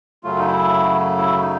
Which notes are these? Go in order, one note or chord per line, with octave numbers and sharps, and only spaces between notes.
F#2 C#3 F#3 A3 F4
D#4
E4
E4
D#4